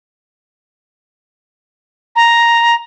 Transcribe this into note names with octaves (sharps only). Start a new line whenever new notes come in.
A#5